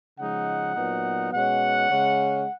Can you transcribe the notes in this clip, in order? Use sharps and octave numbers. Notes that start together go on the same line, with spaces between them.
C#3 F3 G#3 D#4 F#5
A#2 F#3 B3 D#4
B2 G#3 C#4 F#5
C#3 G#3 C#4